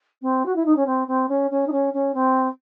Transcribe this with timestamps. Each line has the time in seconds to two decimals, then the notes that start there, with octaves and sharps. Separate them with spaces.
0.22 C4
0.46 F#4
0.56 E4
0.66 D#4
0.77 C#4
0.86 C4
1.08 C4
1.29 C#4
1.51 C#4
1.67 D#4
1.72 C#4
1.94 C#4
2.14 C4